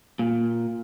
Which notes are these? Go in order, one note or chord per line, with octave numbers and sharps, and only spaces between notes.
A#2